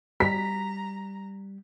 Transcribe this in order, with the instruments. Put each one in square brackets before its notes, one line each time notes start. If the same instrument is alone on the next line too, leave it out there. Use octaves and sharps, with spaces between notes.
[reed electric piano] G3 [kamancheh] A#5 [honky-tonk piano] B6